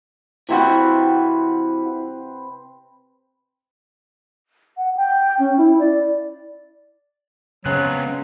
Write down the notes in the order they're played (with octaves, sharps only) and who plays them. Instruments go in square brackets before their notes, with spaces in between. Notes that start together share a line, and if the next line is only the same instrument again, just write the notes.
[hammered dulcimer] C3 C4 B4 [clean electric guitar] E3 E4 F#4
[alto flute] F#5
G5
C#4
E4
D5
[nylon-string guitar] C#3 [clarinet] F#3 [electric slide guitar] G#3 B3 C4 [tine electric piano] F#6